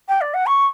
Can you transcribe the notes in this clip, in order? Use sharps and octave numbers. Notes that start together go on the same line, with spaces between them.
G5
D5
F#5
C#6